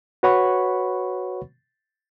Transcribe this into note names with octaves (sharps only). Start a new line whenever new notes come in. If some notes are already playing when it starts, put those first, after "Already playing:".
F#4 B4 C#5 F#5 B5 C#6